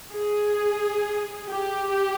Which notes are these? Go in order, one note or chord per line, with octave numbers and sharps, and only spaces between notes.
G#4
G4